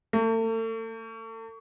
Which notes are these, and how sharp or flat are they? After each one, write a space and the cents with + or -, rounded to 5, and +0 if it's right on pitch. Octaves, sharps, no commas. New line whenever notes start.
A3 +40